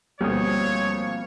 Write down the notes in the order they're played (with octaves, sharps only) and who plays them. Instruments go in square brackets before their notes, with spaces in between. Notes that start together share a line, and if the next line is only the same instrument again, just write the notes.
[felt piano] D2 B2 [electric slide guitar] F3 A#3 C4 [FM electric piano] G3 D#6 [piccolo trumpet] C#5